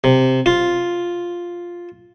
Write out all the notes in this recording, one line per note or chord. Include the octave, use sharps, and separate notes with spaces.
C3
F4